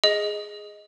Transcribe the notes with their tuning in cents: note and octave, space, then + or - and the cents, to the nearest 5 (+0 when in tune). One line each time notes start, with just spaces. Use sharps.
G#4 +0 D#5 +0